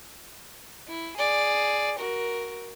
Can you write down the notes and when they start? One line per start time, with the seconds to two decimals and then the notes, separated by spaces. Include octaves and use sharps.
0.88 E4
1.17 G#4 D5
1.99 F#4 A#4